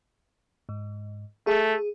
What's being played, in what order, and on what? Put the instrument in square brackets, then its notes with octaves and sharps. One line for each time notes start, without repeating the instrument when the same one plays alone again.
[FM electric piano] G#2
[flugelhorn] A3 [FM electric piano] G#4